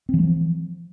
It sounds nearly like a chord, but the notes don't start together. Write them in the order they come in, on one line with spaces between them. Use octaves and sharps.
C4 E3 G#3 F3